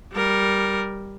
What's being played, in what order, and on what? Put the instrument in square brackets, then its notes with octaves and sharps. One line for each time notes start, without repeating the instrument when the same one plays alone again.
[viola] G3 A#4